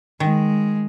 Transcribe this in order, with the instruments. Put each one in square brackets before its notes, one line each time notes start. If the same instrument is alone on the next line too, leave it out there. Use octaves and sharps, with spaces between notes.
[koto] D#3 [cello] G#3